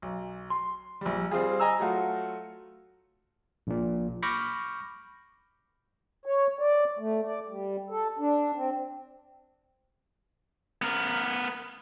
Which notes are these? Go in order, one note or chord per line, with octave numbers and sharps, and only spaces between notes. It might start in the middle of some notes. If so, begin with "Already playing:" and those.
B1
C6
A#1 G3
G3 C4 F4 G#4
D#5 G#5 A#5 E6
F#3 A3 F4 F#4
A#1 A#2
B5 C#6 D6 F6 G6 A#6
C#5
D5
A3
D5
G3
A4
D4
C4
B3 A#4